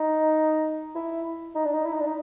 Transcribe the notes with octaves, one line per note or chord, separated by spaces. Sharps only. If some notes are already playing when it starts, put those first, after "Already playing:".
Already playing: D#4
E4
D#4
D4
D#4
E4
D#4
D4
D#4